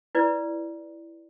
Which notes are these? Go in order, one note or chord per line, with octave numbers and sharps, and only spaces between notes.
E4 B4 D5